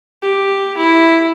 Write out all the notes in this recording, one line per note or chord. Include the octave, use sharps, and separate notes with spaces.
G4
E4